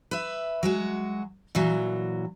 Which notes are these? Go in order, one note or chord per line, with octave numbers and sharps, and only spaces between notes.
B4 E5
F#3 G#3 F#4
A#2 E3 F#3